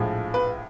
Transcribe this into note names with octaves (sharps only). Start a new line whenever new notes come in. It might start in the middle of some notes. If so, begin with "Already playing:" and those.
Already playing: A#1 A2 F3 G#3
B4